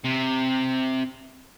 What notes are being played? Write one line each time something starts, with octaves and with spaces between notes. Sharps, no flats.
C3